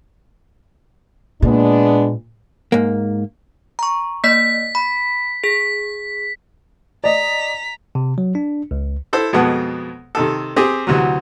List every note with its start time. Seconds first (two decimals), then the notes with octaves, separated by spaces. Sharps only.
1.42 A#2 G#3 B3 D4
2.72 G#2 A#3
3.79 A#5 C#6
4.24 A#3 D5 D#5 B6
4.75 B5
5.44 G#4 B6
7.04 D5 D#5 A#5 B6
7.95 C3
8.18 F#3
8.35 D4
8.71 C#2
9.13 E4 A4 C5
9.33 F2 B2 G#3 B3 A5
10.15 C3 D#3 A4
10.56 C4 G4 G#4
10.87 D2 C3 E3 F#3